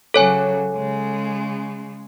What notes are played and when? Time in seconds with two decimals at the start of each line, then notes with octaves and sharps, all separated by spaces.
0.14 C#3 F#3 A4 C#5 G#5
0.75 C#3 G#3